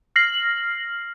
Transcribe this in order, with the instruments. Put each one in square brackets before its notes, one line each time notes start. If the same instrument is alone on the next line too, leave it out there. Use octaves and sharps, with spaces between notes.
[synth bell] F6 A#6 C7 F#7